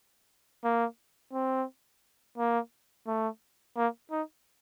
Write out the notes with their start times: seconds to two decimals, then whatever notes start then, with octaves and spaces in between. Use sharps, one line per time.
0.64 A#3
1.33 C4
2.38 A#3
3.07 A3
3.77 A#3
4.11 D#4